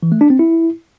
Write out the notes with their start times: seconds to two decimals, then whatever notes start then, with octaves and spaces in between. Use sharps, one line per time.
0.03 E3
0.12 A3
0.21 D4
0.30 C4
0.39 E4